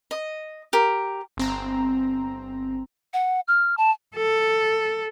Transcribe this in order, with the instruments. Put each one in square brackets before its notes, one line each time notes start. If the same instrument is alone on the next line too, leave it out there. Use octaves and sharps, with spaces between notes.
[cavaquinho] D#5
G4 A#4
[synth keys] G1 C4 A#5
[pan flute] F#5
F6
A5
[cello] A4